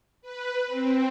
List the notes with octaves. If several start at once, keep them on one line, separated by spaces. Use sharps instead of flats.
B4
C4